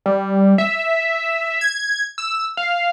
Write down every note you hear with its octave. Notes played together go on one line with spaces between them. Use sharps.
G3
E5
G#6
E6
F5